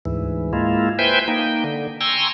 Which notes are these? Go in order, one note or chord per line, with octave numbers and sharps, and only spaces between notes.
D2 G#2 E3
G#3 A#3 E4 F4
B4 C5 E5 G5 G#5 G6
A#3 D#4 G5
D3
G5 G#5 A#5 C6 C#6 E6